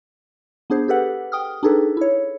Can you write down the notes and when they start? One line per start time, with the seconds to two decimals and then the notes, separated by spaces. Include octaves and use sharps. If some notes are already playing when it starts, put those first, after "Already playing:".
0.70 B3 D4 G#4 C5
0.88 G4 A4 B4 F#5
1.32 G5 D#6 F6
1.63 D4 D#4 G#4 A4 B4
1.97 E4 C#5